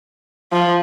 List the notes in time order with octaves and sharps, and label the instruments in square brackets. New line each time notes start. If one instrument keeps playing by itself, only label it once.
[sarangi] F3